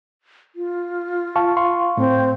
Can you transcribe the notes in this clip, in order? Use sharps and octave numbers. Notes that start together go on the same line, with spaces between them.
F4
F5 A5 C#6
F5 C6 C#6
A2 C4